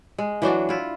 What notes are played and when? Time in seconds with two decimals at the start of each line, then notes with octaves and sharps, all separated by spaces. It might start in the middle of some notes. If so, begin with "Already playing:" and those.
0.18 G#3
0.42 E3 F#3 D4 F#4
0.69 E4 F4